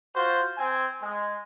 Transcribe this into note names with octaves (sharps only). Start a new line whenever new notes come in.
F4 F#4 C5
C4 G#5
G#3